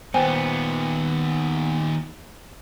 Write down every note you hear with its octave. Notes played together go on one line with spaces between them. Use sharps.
D#2 A#2 B3 C5 G5 G#5